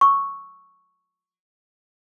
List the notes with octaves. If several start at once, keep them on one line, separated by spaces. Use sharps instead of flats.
C#6 E6